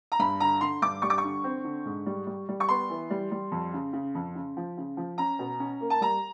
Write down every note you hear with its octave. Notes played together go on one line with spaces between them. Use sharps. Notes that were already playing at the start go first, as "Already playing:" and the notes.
A#5
G2 B5
D3 A#5
D3 C6
G2 D6
G3 C#6
D6
C#6
D3
C4
D3
G#2
G3
G3
G3
C#6
B3 C6
E3
G3
G3
F2
C#3
C#3
F2
C#3
F3
C#3
F3
C#4 A#5
B2
C#4
A#3
A5
G3 A#5